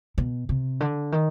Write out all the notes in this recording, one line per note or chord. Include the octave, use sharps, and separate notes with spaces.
B2
C3
D3
D#3